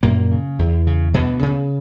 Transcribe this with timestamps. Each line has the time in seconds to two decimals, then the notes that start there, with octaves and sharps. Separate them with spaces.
0.03 F#2 A#2 A#3
0.31 C#3
0.59 E2
0.87 C#3
1.14 D2 B2 B3
1.43 C#3